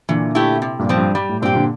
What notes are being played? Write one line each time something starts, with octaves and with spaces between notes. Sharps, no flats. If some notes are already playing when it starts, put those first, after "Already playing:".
A#2 D3 E3
A3 E4 G4
C3
G2 A#2
F3 C4
G2
G3
A2
G2 A#2 C4 G4
A#2 D3